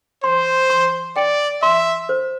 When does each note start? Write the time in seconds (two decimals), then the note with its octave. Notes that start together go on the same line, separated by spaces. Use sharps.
0.23 C5 C6
0.70 C6
1.16 D5 G5
1.62 E5 C6
2.09 C5